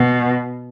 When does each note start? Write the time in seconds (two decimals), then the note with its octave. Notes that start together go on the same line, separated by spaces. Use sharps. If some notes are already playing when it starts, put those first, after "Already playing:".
Already playing: B2